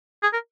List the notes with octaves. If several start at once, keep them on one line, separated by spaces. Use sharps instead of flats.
G#4
A#4